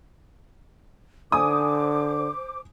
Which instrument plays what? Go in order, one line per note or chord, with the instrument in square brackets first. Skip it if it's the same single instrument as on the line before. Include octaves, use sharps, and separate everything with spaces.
[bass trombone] D3 [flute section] C5 D6 [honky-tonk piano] G#5 D#6